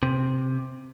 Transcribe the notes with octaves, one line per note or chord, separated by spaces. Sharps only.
C3